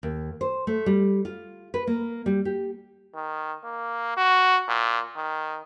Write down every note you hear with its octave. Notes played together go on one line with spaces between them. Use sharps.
D#2
C5
A3
G3
F4
B4
A#3
G3
G4
D#3
A#3
F#4
A#2
D#3